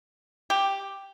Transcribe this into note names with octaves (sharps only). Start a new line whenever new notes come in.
G4